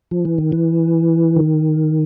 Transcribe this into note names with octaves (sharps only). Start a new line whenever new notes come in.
F3
E3
D#3
E3
D#3